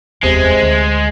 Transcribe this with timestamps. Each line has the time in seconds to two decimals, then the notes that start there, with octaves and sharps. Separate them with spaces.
0.23 F1 D#2 C3 G#3 B3
0.62 D2